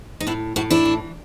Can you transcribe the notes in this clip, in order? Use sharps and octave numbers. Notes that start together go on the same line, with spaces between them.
D#4
A2 D4 E4
A2 E4 F#4
D4 E4
E3